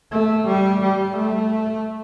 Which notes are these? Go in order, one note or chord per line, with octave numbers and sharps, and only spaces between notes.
A3
G3
G3
A3